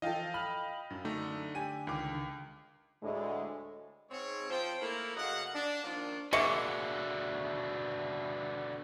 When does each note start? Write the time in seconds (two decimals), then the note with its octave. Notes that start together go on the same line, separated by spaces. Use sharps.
0.02 E3 F3 A4 D#5 F5 G5
0.34 B5 F6
0.90 F#2
1.05 D3 A3 D#4
1.55 G4 G#5 D#7
1.87 C#2 D#3 D6
3.02 D2 A2 D3 G#3
4.10 G#2 C4 C#5
4.50 F3 C5 G5
4.81 A3 A#3 E4 A#4
5.15 F#2 C#3 D#5 F5 F#5
5.54 D4
5.84 D#3 F3 A#3 D4 D#4 F4
6.33 B2 D3 G#3 A#3 E5 C#6 C#7